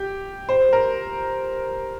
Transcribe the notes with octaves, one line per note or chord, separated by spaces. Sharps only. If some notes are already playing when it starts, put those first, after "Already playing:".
Already playing: G4
C5
A#4